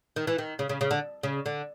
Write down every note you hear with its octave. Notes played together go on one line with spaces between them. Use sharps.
D#3
E3
D#3
C#3
C#3
C#3
D3
C#3
D3